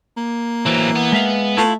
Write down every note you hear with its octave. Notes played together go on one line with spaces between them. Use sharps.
A#3
E3 F#3 C4
B3
G#3 E5 F5
A3 E4 F4 F5